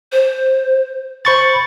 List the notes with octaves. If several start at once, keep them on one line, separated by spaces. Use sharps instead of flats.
C5
C5 B5 C#6 A6